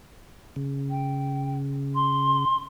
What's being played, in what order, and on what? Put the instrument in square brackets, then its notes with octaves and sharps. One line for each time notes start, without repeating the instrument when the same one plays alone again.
[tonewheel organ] C#3
[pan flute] G5
C6